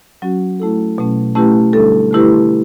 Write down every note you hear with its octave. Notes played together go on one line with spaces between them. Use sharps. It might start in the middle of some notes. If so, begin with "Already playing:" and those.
F#3 C#4 F#4
A3 E4 A4
B2 F#3 A3 C#4
A3 C#4 E4 G4 B4
D3 G3 D4 A4
D3 A3 E4 G4 B4